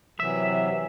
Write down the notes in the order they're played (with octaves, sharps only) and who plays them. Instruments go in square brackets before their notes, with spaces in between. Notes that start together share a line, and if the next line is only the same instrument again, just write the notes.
[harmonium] C3 E3 F#3 [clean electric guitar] E5